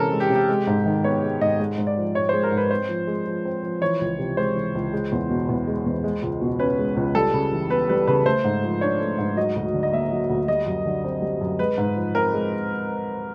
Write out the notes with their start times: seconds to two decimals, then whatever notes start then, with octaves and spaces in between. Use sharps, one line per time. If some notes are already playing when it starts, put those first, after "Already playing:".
Already playing: C3 E3 G#3 C#4 A4 A#4
0.11 G#3
0.20 G4
0.30 C3
0.35 G4
0.49 G#3
0.67 G#2
0.86 D#3
1.04 B3 C#5
1.23 G#3
1.41 G#2 D#5
1.59 G#3
1.78 G#2
1.87 D5
1.97 F3
2.15 G#2 C#5
2.29 G#3 C5
2.43 A#4
2.52 G#2
2.57 B4
2.71 C4 C5
2.89 F3
3.07 G#3
3.26 F3
3.45 C4
3.63 F3
3.82 E3 C#5
4.01 C#2
4.19 C3
4.37 G#3 C5
4.56 E3
4.75 C#2
4.93 G#3
5.12 E2
5.30 B2
5.49 E2
5.67 G#3
5.86 E2
6.04 G#3
6.23 C#2
6.41 B2
6.59 C#4 B4
6.79 G#3
6.96 C#2
7.15 G3 A4
7.33 C#3
7.52 E3
7.70 B3 B4
7.89 G3 B4
8.07 C#3 B4
8.25 A3 C5
8.44 G#2
8.64 F3
8.81 D4 C#5
9.00 A3
9.18 G#2
9.37 F#3 D#5
9.56 D2
9.74 D3
9.83 D#5
9.92 A#3 E5
10.12 F#3
10.30 D2
10.48 G3 D#5
10.66 F#2
10.86 D3
11.04 C4
11.22 G3
11.41 F#2
11.59 G#3 B4
11.78 G#2
11.96 F3
12.15 C4 A#4
12.34 G#3